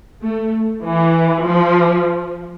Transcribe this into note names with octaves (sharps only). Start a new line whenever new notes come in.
A3
E3
F3